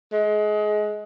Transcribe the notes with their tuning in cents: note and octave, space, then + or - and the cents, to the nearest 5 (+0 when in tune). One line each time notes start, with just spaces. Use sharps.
G#3 +25